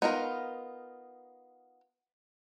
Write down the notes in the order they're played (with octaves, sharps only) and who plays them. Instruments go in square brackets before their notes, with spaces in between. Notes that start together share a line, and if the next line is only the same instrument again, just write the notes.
[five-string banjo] B3 D#4 F4 A#4